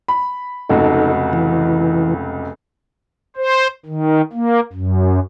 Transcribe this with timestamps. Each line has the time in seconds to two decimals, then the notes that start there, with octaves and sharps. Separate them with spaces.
0.08 B5
0.69 F1 C#2 D#4 F#4 A4
1.33 E3
3.37 C5
3.86 D#3
4.33 A#3
4.73 F#2